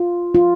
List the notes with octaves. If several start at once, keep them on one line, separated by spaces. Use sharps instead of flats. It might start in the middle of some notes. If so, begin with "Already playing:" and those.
Already playing: F4
F4